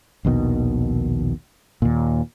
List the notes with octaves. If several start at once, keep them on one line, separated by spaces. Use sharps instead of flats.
A#1 D#2 B2 D#3
D#2 A#2